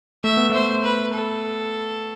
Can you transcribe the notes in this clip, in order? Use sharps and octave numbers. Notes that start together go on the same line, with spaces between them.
A3 E5
B3
A3 C5
B4
A4